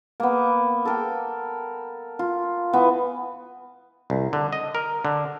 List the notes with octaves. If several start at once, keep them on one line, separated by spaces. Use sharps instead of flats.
A#3 B3
A4 A#4 G5
F4
E3 B3
C2
D3
D#5
A#4
D3